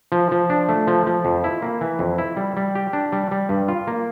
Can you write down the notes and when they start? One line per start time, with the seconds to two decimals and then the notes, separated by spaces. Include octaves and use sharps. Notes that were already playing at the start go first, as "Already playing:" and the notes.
0.12 F3
0.32 F3
0.50 D4
0.69 A3
0.87 F3
1.07 F3
1.25 F2
1.44 E4
1.62 A#3
1.81 E3
1.99 F2
2.18 E4
2.37 G3
2.57 G3
2.75 G4
2.93 D4
3.12 G3
3.31 G3
3.49 G2
3.68 F4
3.87 A#3